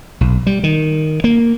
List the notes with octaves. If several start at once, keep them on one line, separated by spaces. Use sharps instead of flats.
B1
G3
D#3
A#3